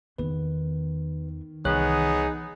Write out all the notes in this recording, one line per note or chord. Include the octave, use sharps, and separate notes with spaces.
E2 D#3 B3 B4
C2 E3 B3 D#4 G#4 C#5 F#6